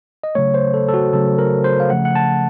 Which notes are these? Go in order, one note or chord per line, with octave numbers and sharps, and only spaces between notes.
D#5
C#3 F#3 A3 C#5
C5
A4
A4
F#4
C#3 F#3 A3 A4
A#4
C5
F5
C#3 F3 A3 F#5
F#5
A5